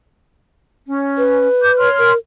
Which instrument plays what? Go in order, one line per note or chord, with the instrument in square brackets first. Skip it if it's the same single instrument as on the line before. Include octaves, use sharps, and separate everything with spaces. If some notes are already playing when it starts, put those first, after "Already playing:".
[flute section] C#4
[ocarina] B4
[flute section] D6 G6
C#5 C6 F6
[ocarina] A#4